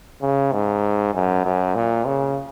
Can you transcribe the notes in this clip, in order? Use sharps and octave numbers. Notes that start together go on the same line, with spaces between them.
C#3
G#2
F#2
F#2
A#2
C#3